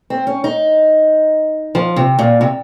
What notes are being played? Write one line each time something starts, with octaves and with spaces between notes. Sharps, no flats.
C4
C#4
D#4
F3
C3
A#2
C3